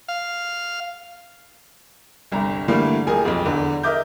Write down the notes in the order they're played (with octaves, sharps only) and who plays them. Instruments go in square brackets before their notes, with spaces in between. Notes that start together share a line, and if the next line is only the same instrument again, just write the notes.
[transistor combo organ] F5
[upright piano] G1 C2 A#5
D3 E3 G3 A3 A#3
D#1 G#4 A#4 G#5
B1 F2
E2 D3
A#4 D#5 E5 D6 G6